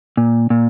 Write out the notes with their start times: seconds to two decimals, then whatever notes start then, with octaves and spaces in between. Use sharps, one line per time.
0.17 A#2
0.50 A#2